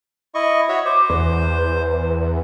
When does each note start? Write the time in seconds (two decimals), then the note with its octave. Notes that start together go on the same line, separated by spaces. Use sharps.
0.35 E4 D#5 C#6
0.69 F#4 C#5 E5
0.85 C5 D6
1.10 E2 B4